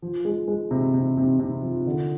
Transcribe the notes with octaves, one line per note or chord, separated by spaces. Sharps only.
F3
G#3
G#3
C3
C3
C3
C3
F3
D3